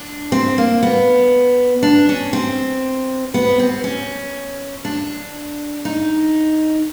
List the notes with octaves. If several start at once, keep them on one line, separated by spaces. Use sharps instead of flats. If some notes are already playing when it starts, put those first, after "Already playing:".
Already playing: D4
C4
A#3
B3
D4
C#4
C4
B3
C4
C#4
D4
D#4